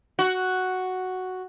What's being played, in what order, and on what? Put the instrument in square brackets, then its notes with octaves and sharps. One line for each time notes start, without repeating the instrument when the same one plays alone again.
[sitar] F#4